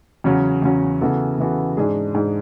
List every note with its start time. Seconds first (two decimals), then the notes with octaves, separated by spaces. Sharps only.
0.24 E2 C#3 F#3 C#4
0.62 E2 C#3 F#3 C#4
1.01 C#3 E3 B3 F#4 A4
1.38 C#3 E3 B3 F#4 A4
1.77 G#2 G#3 D4 G#4
2.15 G#2 G#3 D4 G#4